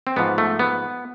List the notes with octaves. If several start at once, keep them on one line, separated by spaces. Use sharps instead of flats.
C4
G#2 F3 B3
A3
B3